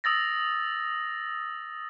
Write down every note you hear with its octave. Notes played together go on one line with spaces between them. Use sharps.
D#6 E6 A6 A#6